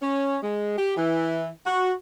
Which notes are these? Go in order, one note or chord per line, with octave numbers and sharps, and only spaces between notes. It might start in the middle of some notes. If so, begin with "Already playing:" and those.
C#4
G#3
G4
E3
F#4